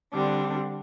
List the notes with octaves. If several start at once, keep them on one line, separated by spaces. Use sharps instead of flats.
D3 G3 C4 D4